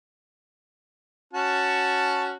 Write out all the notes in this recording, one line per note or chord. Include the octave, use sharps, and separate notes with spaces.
C#4 F#4 A5